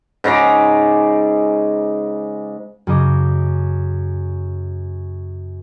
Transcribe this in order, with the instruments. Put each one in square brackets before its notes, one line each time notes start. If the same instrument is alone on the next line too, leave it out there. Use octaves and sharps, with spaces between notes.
[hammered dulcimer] G#2 C#3 A#5 D6
[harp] F#2 C#3 D#5 D6 D#7